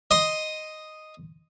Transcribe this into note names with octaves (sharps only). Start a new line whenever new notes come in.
D#5 C6 D#6